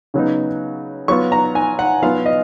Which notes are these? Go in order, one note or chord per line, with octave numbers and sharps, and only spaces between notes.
C#3 F#3 B3 D#4
F#3 B3 F4 C#6
A#5
G#5
F#5
F#3 B3 F4 F5
D#5